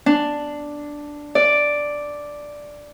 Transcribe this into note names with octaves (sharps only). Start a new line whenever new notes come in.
D4
D5